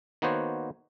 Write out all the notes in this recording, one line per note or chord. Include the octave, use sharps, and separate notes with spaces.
D#3 A#3 B3 F#4 C5 C#5